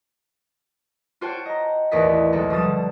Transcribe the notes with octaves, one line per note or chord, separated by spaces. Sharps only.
F4 F#4 C5 C#5 G5 A5
D#5 A#5
A1 D#2 E3 D5 D#5 B6
B1 D#3 G#3 C4 A4 D#5
B2 F3 G3 D#6 A6 E7
D3